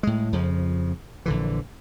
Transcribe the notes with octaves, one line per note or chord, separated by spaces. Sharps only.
A2 G#3
F2 C#3 F3
A#1 D3 E3